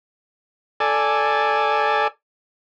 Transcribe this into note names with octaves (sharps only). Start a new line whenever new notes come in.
A4 D5 G#5